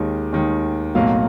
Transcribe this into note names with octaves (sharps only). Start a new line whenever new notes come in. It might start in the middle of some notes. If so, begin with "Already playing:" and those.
Already playing: D#2 D#3 G#3
D#2 D#3 G#3
B1 A2 F#3 A#3 F5